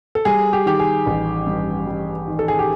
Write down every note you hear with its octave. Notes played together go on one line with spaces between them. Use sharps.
A4
G3 G#4
G4
D#3 G4
G#4
A1
G2
G3
D#3
A4
G#4
G4